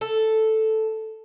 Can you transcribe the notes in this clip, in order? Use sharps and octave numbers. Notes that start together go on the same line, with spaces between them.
A4